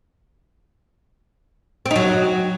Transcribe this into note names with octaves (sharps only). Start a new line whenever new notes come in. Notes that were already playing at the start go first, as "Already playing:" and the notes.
C4
D#4
F#3